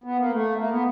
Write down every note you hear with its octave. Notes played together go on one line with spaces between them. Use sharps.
B3
A#3
A3
A#3
B3